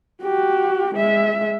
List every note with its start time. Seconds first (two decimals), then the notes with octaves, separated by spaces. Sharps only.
0.23 F#4 G4
0.95 G#3 E5